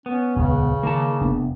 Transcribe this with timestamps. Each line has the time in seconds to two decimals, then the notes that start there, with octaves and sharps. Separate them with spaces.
0.06 B3 C#4
0.36 D#1 C#2 C#3
0.83 D#3 A#3 A5
1.21 F1 B3 D4